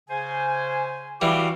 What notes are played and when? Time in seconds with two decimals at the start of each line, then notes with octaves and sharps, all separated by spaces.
0.09 C#3 C5 G#5
1.21 E3 G3 F#4 F5 D6